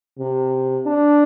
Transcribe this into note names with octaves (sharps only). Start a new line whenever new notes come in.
C3
D4